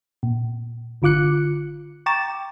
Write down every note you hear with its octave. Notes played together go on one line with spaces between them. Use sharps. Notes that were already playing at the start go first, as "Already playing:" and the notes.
A#2
G1 D3 F4 D6 F#6 C#7
G5 A#5 C#6 D6 A6 E7